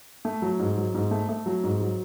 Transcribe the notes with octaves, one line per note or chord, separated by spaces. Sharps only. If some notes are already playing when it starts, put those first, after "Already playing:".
A3
F#3
G#2
F#3
G#2
A3
A3
F#3
G#2
F#3